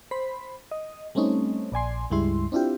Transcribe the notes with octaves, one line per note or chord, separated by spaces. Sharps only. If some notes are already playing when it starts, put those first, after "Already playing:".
C5 B5
D#5
G3 A3 C4 C#4 D#4
A#1 D5 G#5 C6
C#2 G2 G3 G#3 E4 C6
C4 D4 E4 F4 G4